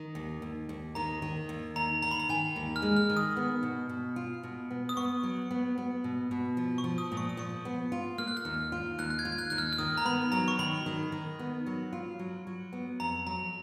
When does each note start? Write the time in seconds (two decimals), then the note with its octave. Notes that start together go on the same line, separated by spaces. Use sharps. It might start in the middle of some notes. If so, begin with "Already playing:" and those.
Already playing: D#3
0.15 D#2
0.42 D#2
0.69 D#2
0.95 D#3 A#5
1.22 D#3
1.49 D#2
1.76 D#2 A#5
2.02 D#3 A#5
2.11 B5
2.20 A#5
2.29 D#3 G#5
2.56 D#2
2.76 F6
2.82 G#3
2.97 F6
3.10 D#3
3.17 D#6
3.37 B3
3.63 B2
3.89 B2
4.16 F4
4.43 B2
4.70 B3
4.89 D#6
4.97 B3 C#6
5.23 F#3
5.51 B3
5.78 B3
6.04 B2
6.31 B2
6.57 F3
6.78 C#6
6.84 F3
6.98 D#6
7.12 A#2
7.17 C#6
7.29 D#6
7.37 F3 C#6
7.65 B3
7.92 F4
8.18 A#3 F6
8.28 F#6
8.37 F6
8.45 D#2
8.72 F4
8.98 D#2 F#6
9.10 F#6
9.19 G#6
9.25 F4
9.32 G#6
9.38 F#6
9.50 D#2 F#6
9.58 F6
9.73 F6
9.78 D#3 D#6
9.97 A#5
10.05 B3 B5
10.32 F#3 A#5
10.48 C#6
10.59 D#3 B5
10.86 D#3
11.12 D#3
11.39 B3
11.66 F#3
11.93 F4
12.19 F#3
12.47 F#3
12.73 B3
13.00 F2 A#5
13.27 F#3 A#5